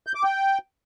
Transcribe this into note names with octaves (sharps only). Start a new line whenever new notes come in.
G6
D6
G5